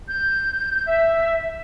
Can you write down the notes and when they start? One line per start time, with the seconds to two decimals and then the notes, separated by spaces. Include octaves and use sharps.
0.09 G6
0.87 E5